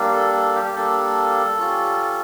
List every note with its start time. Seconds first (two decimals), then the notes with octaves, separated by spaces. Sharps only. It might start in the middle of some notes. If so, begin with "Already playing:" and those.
Already playing: G3 A#3 D4
0.13 A4
0.34 A4
0.55 G4
0.76 G3 A#3 D4 A4
1.58 G3 C#4 F4